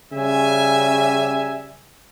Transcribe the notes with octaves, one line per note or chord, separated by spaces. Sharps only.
C#3 G3 E5 G#5